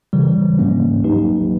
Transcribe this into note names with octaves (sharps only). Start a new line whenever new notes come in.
C#3 E3 G3
G#2 F3 A#3 C#4
F#3 A#3 D#4 G4 B4